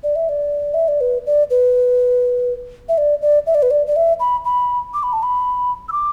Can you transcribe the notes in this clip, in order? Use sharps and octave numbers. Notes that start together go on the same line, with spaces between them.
D5
E5
D5
E5
D5
B4
D5
B4
E5
D5
D5
E5
D5
B4
D5
D5
E5
B5
B5
D6
B5
A5
B5
E6
D6